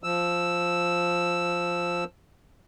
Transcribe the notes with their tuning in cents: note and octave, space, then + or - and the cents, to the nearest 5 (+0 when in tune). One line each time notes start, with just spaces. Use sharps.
F3 +0 E6 +0